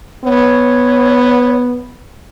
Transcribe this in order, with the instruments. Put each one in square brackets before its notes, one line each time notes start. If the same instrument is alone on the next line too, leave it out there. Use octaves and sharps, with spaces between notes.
[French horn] B3 [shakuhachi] C#5